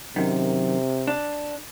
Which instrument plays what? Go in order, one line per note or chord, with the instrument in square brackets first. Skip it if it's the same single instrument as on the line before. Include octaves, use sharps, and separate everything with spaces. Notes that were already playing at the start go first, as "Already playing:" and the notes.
[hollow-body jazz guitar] F#2 D#3 [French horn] C3
[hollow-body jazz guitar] D4